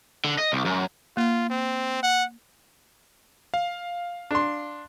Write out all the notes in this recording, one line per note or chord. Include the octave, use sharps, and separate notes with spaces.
D3
D#5
C2
F#2
A#3 F4
C4
F#5
F5
D4 C6